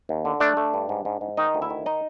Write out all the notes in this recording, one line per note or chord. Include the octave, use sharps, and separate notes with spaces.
D#2
D3
A3 D4 D5
A3
G2
G#2
G#2
G#2
D#3 D#4 D#5
D2
E4 E5
D#3
D#4 D#5